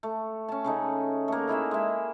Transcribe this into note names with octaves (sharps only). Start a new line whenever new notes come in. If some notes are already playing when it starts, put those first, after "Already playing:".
A3
C#4 A5
C#3 A3 D#4
A3 A#3
D#4 E4 G#4 E5
G#3 E5